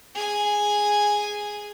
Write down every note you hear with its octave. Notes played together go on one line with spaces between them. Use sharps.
G#4 G#5